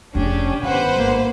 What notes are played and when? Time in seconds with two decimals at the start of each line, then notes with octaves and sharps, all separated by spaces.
0.15 F1 F2 C#3 C#4 D4 G4
0.63 G1 D#3 B4 C5 F#5
0.97 G#1 A#3